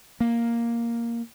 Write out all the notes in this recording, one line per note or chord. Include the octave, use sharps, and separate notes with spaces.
A#3